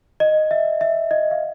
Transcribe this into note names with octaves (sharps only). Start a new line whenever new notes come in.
D#5
E5
E5
D#5
F5